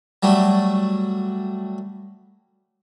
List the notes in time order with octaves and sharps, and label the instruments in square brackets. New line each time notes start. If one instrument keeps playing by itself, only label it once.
[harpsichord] F#3 G3 A3